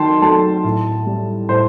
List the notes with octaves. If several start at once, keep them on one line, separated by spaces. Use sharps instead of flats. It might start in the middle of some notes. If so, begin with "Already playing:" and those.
Already playing: D#3 F#3 G5 A5 C6
F#3 A3 A5
A2
G3
A2 C5